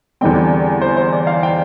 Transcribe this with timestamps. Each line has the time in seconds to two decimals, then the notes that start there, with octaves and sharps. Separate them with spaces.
0.21 E2 D3 G3 C4 G5
0.81 C5
0.97 C5
1.13 D5
1.27 F5
1.43 G5